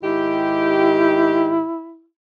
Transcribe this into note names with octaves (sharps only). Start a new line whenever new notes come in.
G#2 D#3 E4 G4